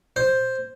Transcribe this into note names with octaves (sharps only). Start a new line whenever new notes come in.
C5